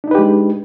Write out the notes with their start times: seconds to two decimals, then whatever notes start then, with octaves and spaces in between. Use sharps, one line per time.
0.04 D4
0.08 D#4
0.11 B4
0.15 G4
0.19 G#3